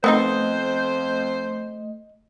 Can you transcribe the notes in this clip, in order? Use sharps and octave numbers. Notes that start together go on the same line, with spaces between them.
F2 A3 B3 C4 D#4 C5 D#5